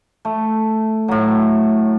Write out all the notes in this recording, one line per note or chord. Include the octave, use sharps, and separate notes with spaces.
A3
A2 F#3